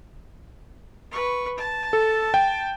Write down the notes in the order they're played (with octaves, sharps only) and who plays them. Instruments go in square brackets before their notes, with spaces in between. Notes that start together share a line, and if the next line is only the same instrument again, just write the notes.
[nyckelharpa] B4 C#6
A5
[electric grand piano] A4
G5